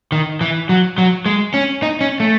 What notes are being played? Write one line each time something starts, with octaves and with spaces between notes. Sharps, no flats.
D#3
E3
F#3
F#3
G#3
C#4
D#4
C#4
A3